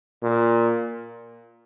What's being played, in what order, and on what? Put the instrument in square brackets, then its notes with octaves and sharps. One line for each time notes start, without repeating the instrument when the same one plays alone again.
[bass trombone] A#2